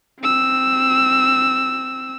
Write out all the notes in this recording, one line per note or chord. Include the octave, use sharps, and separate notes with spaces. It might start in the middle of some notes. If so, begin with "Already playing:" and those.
C4 E6